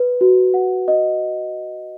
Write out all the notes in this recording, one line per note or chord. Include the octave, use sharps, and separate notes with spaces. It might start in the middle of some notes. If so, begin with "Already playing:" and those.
Already playing: B4
F#4
F#5
D#5